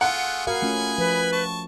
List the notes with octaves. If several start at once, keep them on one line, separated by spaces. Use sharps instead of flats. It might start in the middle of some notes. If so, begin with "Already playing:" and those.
A3 F4 G#4 F#5
F#4 G#4 A#4 F5 G#5 B5
A3 C#4 F4
F3 B4
A5 C#6